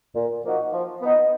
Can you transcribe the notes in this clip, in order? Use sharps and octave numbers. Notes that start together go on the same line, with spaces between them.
A#2
F3 A#3 D#4 F#4
F3
B3 D#4